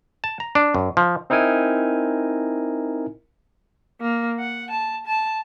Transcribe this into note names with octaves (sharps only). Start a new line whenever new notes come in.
A5
A#5
D4
F#2
F3
C4 D#4 E4 A#4 G#5
A#3
F#5
A5
A5